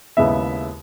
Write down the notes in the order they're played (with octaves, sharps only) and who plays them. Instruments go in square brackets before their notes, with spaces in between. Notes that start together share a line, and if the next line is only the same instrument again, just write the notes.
[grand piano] D#2 C#3 G#3 B3 E4 E5